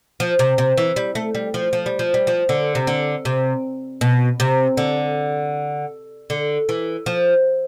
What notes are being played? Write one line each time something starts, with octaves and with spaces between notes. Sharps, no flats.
F3
C3
C3
E3
G3
A3
G3
F3
F3
G3
F3
G3
F3
D3
C3
D3
C3
B2
C3
D3
D3
E3
F3